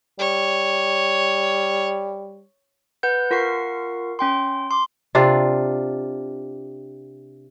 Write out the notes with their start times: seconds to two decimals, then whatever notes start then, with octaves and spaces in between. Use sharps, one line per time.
0.19 G3 C#5
3.03 B4 F#5 G6
3.31 F4 A#4 F#5 C#6 C7
4.19 C#4 G5 C6
4.71 C6 D6
5.15 C3 D4 F4